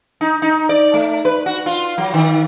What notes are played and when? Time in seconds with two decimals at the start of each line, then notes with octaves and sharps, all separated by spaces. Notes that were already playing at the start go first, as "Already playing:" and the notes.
0.21 D#4
0.42 D#4
0.69 D5
0.94 A3
1.25 B4
1.46 F#4
1.66 F4
1.98 F#3
2.14 D#3